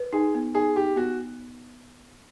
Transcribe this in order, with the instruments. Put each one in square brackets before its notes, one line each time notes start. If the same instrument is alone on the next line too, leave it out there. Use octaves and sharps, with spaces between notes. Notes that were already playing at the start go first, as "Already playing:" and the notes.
Already playing: [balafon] B4
[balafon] D#4 [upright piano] G#4
[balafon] B3
[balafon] D#4 [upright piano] G#4
[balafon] D#4 [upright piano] G4
[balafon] B3 [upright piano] F#4